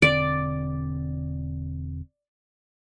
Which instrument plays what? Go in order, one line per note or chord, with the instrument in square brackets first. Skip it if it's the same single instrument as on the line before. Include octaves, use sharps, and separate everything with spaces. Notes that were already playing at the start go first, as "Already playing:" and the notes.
[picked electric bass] E1 D3 C4 [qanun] D5